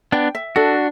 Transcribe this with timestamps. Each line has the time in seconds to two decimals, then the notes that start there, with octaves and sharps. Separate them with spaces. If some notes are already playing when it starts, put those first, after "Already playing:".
0.12 B3 D4 G5
0.35 E5
0.56 D4 F#4 A4